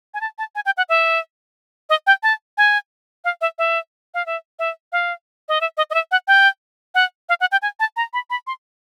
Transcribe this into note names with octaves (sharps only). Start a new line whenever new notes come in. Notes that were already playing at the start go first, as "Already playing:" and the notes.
G#5
A5
A5
G#5
G5
F#5
E5
D#5
G5
A5
G#5
F5
E5
E5
F5
E5
E5
F5
D#5
E5
D#5
D#5
E5
F#5
G5
F#5
F5
F#5
G5
G#5
A5
A#5
B5
B5
C6